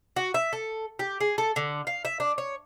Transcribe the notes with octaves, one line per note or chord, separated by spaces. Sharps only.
F#4
E5
A4
G4
G#4
A4
D3
F5
E5
D4
C#5